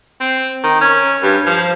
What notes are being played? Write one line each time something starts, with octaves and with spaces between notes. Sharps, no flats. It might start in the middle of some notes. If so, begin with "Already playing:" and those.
C4
D#3
C#4
G2
F3